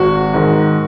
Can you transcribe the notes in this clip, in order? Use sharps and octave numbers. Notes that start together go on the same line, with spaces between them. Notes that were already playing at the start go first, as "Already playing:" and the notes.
Already playing: G#1 F#4
G#2 D#3